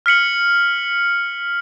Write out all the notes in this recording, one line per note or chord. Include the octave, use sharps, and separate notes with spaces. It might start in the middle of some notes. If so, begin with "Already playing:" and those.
F6 B6 C#7 F#7